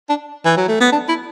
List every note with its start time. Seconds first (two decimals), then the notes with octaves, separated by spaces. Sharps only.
0.09 D4
0.45 E3
0.57 F#3
0.68 A3
0.80 B3
0.92 D4
1.09 E4